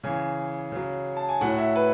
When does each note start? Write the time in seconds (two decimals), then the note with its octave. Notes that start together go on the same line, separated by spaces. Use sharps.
0.04 C#3 E3 G#5
0.72 C#3 F#3
1.17 A5
1.29 G#5
1.41 A2 F#3 F#5
1.58 E5
1.76 B4